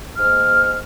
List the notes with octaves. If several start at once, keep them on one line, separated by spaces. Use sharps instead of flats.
G#2 A#3 F6